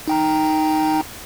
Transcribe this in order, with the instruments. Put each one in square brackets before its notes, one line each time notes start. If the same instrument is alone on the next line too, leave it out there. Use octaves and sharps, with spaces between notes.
[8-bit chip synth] D#4 G5 A#5